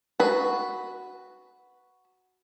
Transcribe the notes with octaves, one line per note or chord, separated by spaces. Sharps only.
F#4 B4